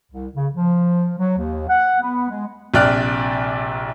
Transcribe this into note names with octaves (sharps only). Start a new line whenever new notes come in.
C2
C#3
F3
F#3
D#2
F#5
B3
G#3
A#1 C3 D5 G5 F6 F#6